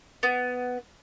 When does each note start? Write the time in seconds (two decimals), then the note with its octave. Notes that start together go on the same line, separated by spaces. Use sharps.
0.23 B3